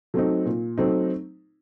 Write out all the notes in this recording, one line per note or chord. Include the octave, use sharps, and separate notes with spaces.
F#3 A3 C4 D#4
A#2
F#3 A3 C4 D#4